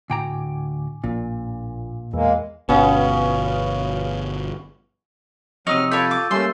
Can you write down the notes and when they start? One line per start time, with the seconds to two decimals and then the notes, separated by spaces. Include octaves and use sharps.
0.10 D2 A2 G5 G#5 A#5 D6
1.04 A#1 A#2
2.14 E2 G#3 A#3
2.69 G1 B2 B3 C#4 B4 F5
5.67 F2 C3 F#3 D#4 C#6 E6 F6 D#7
5.92 F4 A4 C#5 D5 B5 G6 A6
6.11 D6
6.31 G3 A3 A#3 C#4 C6 E6